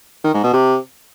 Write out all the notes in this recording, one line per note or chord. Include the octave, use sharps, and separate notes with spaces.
D#3
G#2
B2
C3